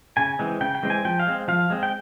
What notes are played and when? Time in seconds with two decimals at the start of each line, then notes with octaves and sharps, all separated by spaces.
0.17 C#3 G#5
0.39 E3 G#3 C4
0.61 C#3 G5
0.75 G5
0.82 E3 G#3 C4
0.90 G#5
1.05 F3 G5
1.20 F5
1.27 G#3 C4
1.48 F3 F5
1.70 G#3 C4
1.83 G5